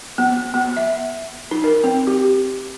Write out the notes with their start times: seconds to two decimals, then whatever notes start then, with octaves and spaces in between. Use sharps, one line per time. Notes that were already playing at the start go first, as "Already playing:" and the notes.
0.18 B3
0.54 B3
0.77 E5
1.51 D#4
1.64 A#4
1.84 C4
2.07 G4